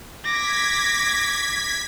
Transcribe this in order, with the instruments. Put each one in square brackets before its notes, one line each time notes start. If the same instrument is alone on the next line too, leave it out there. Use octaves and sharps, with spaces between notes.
[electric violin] D6 A#6 [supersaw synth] G#6 B6